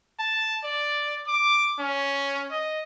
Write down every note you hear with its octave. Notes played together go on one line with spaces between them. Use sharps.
A5
D5
D6
C#4
D#5